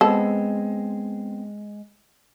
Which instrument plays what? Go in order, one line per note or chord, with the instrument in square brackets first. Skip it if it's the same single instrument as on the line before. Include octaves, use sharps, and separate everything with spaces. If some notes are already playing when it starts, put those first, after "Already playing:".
[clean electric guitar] G#3 [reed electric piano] B3 C4 G5 [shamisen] A4